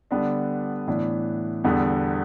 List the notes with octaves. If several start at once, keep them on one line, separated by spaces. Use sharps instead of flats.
D3 G3 B3 D4
A2 E3 B3 D4
E2 D3 G3 B3